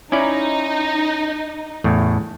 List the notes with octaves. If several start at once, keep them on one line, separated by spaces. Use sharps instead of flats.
C#4 D#4 E4 D5
E2 A2